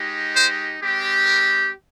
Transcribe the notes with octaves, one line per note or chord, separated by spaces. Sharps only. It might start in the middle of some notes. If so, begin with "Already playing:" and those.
Already playing: G#3 D#4 G4
C5
G#3 C4 G4
A#4